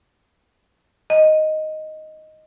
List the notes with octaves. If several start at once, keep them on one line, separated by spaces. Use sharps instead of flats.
D#5